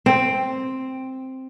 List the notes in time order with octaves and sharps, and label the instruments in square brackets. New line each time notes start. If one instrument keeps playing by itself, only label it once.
[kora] C4